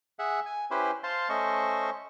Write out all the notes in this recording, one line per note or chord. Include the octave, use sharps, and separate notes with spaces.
G#4 E5 F#5
G#5
C#4 E4 G4 B4 C5
C5 F5 A5 C6
A3 C#4 C5 D#5 C#6